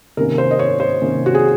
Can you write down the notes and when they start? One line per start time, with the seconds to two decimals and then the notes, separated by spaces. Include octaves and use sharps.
0.17 C3 D#3 A#3 C#4 A#4
0.38 C5
0.51 D#5
0.59 C#5
0.80 C5
1.01 C3 D#3 A#3 C#4
1.26 F#4
1.35 G#4